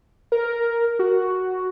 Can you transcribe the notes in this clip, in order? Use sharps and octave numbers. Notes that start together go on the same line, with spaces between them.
A#4
F#4